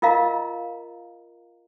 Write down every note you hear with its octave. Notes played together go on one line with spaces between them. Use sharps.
F4 A#4 D#5 F5 A#5